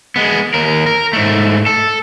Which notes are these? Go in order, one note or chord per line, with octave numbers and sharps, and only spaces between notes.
G#3 B3
D#2 A#4
A#4
G#2 A3
A4